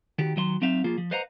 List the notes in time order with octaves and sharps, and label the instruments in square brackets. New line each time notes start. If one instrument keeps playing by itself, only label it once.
[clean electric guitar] D#3 F#4 G4
D#3 F#3 D#5 C6
F#3 C4 D#4 E5 F5
F3 A#3 F4 G#4
F3
B4 C5 D#5 F5 F#5 A#5